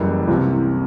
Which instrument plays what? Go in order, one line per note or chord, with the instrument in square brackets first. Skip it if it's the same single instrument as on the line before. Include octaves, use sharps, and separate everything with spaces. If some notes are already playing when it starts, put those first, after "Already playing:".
Already playing: [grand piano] F#1 F#2 E3 G3
C2 C3 E3